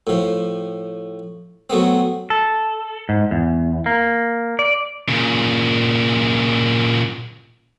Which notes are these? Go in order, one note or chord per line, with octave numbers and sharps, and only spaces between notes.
A2 F3
F#3 A3 B3 C4
A4
G#2
E2
A#3
D5
A#2 C#3